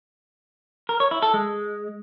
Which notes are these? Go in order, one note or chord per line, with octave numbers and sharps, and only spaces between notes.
A#4
C#5
E4
A4
G#3